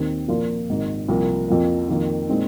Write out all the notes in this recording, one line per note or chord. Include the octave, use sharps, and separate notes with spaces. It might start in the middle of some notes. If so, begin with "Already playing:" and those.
Already playing: D#2 D#3 C4 D#4
A#2 F3 A#3 F4
G#1 G#2 D#3
C2 C3 F3 A#3
F2 F3 A#3
F2 D#3 A#3 F4
A#2 G#3 C4 D#4